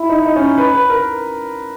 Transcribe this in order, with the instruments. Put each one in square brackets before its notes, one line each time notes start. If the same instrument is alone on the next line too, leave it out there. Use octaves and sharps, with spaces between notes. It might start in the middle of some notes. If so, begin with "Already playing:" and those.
Already playing: [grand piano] E4
D#4
D#4
C#4
B4
B4
A#4